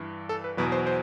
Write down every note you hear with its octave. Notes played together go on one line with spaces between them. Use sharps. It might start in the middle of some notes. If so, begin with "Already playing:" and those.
Already playing: G2 E3
A4
B4
E2 B2 F#3 B4
C5
C5